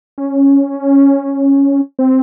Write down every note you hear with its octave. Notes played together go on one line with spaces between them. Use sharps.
C#4
C4